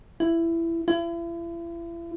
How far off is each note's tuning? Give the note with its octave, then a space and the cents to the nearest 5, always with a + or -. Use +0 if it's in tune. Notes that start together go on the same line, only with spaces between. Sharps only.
E4 +15
E4 +40